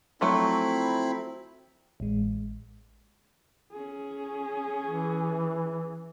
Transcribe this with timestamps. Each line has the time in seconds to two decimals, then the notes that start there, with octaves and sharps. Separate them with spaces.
0.21 F3 F#3 A3 C4 E4 B5
2.00 A1 G#3
3.72 C#4 G#4
4.86 E3